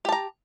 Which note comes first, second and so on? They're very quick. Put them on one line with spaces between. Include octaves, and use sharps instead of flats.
G4 A5 A#5